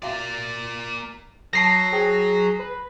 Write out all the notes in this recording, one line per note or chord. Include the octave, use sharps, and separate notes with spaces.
A#3 F#4 D5 E5 F5
F#3 A4 A5 A#6 C7
G#4 C5 G5 D#6
B4